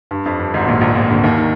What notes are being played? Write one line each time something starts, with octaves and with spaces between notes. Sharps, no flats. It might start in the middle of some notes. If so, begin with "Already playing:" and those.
G2
F2
G2
G#1 G#2
A#1 A#2
A#1 A#2
A#1 A#2
D2 D3
D#2 D#3
D#3